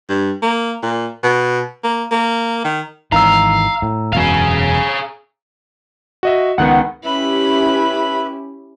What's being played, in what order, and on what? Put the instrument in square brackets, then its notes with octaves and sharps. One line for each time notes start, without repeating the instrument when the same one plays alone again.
[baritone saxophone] G2
A#3
A#2
B2
A#3
A#3
D#3
[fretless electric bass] G#1 D#3 E3 [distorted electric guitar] F5 [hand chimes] A#5 E6
[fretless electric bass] A2
[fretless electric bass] E1 F#2 B2 [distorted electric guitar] G#4 F5
[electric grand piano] F#4 D#5 E5
[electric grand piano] C#2 D#3 B3 [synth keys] F#5
[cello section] C#4 E4 G4 [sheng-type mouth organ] B4 E5 [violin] B5